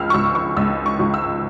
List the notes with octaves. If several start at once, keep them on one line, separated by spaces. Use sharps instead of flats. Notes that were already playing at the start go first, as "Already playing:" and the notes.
Already playing: C#2 E6 F6
C#6
C#2 E6
C#6
C#2 E6
C#6
C#2
E6